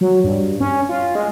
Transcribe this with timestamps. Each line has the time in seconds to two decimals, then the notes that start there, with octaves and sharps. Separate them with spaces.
0.01 F#3
0.24 G2
0.60 C#4
0.89 F4
1.15 G#3